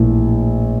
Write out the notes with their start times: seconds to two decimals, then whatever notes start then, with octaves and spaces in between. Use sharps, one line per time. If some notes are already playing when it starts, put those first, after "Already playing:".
Already playing: A#1 A2 E3 A#3